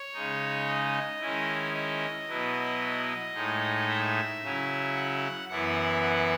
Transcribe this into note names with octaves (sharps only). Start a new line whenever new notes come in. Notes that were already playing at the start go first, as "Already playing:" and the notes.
Already playing: C#5
C#3 G#3 D#4
D#5
D#3 G#3 C#4 E4
D#5
B2 F#3 B3 E4
A2 G#3 D#4
E5
C#3 F#3 C#4 E4
F#5
F#2 E3 B3 E4 F#5
F#5